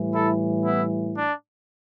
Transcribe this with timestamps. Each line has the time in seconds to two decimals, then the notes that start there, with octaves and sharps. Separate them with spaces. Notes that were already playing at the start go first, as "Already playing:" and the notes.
Already playing: A2 E3 G3
0.14 E4 A4
0.65 B3 E4
1.17 D4